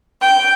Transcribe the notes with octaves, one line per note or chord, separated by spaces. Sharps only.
G5